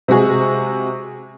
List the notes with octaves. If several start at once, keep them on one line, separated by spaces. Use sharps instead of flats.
C3 G#3 F#4 G#4